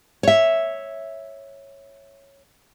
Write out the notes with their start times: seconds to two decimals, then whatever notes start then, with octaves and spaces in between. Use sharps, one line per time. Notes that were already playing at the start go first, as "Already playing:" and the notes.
0.23 C#5 E5